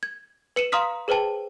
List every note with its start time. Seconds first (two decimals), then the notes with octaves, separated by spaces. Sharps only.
0.03 G#6
0.56 B4 C#7 D#7 E7
0.72 F5 A#5 C6 D#6 F6 B6
1.08 G#4 B4 C5 G5 A5